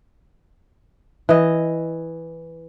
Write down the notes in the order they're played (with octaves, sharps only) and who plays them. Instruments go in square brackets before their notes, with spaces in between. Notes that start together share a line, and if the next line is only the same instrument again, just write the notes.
[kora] E3 D#5